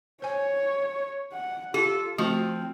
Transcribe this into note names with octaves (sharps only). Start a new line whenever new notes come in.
C5 C#5 G#5
F#5
F4 G4 A4
F3 A3 C4 F#4